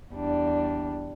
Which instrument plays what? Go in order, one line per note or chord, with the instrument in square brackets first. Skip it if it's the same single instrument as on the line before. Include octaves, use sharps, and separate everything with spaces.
[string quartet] E2 G3 D4